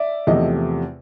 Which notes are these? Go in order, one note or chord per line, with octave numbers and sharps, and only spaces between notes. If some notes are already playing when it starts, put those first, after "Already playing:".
Already playing: D5 E5
E2 C3 F3 A3 D#5